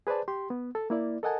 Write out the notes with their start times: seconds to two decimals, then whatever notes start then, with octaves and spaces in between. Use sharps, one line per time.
0.07 G#4 B4 C5 D5 A5
0.28 G4 C6
0.50 B3
0.75 A4
0.90 A#3 E4 D5
1.23 A4 A#4 D#5 F#5 G#5 A5